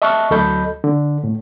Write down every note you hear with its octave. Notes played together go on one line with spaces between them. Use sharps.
D#5 E5 A5 C#6 F6 F#6
D2 F#3 A4 D#5 B5 G6
D3
A2